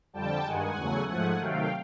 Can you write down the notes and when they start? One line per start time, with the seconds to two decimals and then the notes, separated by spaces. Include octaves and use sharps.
0.13 F2 D3 G3 G5 A5
0.45 G2 D#3 G#3 F#5 G#5
0.76 E2 C#3 F#3 A3
1.08 G#2 F3 A3 F#5 G#5
1.40 C3 D#3 F#3 A3 F5 G5